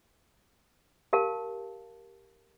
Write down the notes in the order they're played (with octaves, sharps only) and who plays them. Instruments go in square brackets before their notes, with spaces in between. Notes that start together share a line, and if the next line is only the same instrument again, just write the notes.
[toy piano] G4 A#4 F5 A5